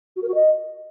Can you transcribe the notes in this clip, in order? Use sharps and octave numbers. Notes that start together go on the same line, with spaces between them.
F#4
A#4
F#4
D#5